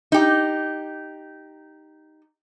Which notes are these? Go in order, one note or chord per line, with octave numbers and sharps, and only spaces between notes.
D#4 G4